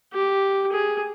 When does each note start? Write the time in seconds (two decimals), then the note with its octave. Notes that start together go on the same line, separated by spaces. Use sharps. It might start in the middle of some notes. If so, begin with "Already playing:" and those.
0.13 G4
0.72 G#4